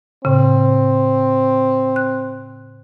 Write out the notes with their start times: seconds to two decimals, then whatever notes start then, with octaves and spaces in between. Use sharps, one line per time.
0.25 A2 C#3 C4
1.96 F#6